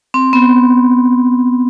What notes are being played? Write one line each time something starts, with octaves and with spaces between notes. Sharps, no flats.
C4
B3